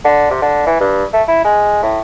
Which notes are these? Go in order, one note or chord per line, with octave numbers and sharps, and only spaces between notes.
D3
C3
D3
E3
G2
A3
E4
G#3
A2